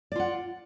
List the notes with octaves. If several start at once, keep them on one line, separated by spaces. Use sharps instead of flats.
F4 D5 F#5